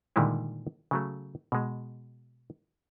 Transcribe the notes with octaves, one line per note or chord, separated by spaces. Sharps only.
A#2 D3 D#3 G3 G#3 E4
C#3 F#3 A3
B2 G#3